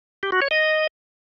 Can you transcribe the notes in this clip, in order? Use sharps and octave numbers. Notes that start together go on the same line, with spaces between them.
G4
F#4
C#5
D#5